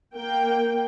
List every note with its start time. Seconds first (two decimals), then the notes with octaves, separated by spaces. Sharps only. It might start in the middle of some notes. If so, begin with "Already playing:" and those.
0.15 A#3 G5